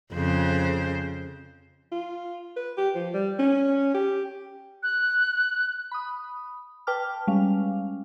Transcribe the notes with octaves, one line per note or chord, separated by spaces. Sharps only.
F2 C#3 C5
F4
B4
G4
F3
G3
C#4
G4
F#6
B5 D#6
B4 G5 A5 D6 F6
G3 G#3 C#4 F5